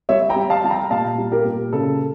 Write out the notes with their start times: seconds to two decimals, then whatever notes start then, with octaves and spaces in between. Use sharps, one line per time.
0.09 G3 C#5 E5
0.29 G5 A#5
0.36 G3
0.50 F5 A5
0.64 G3 A5
0.71 G5 A#5
0.91 A#2 F5 A5
1.18 G3
1.32 G4 A#4
1.45 A#2
1.73 C#3 A4